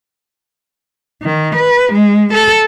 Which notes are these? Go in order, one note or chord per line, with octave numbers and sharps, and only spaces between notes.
D#3
B4
G#3
A4